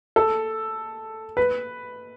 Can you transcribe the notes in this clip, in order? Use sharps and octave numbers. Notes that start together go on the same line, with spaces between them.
A4
B4